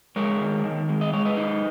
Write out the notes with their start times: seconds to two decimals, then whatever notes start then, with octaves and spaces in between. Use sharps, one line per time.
0.16 G#3 A#4 C#5
0.41 D#3
0.64 D#3
0.89 G#3
1.01 D#5
1.13 G#3 C#5
1.25 B4 D#5
1.37 D#4